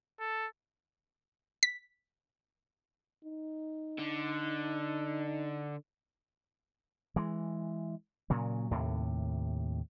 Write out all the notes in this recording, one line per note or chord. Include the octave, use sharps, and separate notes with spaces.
A4
B6
D#4
D3
E3 G#3
A#2 C#3 F#3
D#2 A2 C3